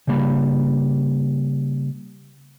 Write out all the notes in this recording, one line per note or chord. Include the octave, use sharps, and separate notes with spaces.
C#3 G3 A#3 B5